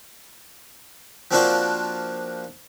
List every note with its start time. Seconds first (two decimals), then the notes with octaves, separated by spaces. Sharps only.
1.31 F3 A#3 C4 D4 F4 F#4